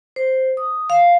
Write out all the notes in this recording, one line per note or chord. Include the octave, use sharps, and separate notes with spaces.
C5
D#6
F5